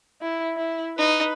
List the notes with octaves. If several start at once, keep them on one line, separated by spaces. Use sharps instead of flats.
E4
E4
D#4 B4